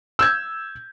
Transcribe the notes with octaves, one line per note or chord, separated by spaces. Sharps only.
E6 G6 G#6